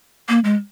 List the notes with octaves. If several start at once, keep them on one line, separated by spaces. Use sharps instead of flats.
A#3
G#3